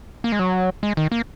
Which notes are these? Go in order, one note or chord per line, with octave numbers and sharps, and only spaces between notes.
A#3
G#3
F#3
G#3
D#3
A#3